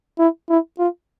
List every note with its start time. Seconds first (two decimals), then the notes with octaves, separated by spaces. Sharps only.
0.19 E4
0.50 E4
0.79 F4